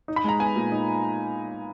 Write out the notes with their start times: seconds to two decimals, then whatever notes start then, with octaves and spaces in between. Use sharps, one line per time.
0.08 D#4
0.16 B5
0.24 G#3 A#5
0.40 B3 G#5
0.56 A#2
0.72 D#4